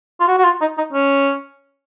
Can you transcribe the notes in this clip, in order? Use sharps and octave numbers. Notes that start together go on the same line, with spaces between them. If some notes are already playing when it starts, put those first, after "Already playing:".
F4
F#4
F#4
F4
D#4
D#4
C#4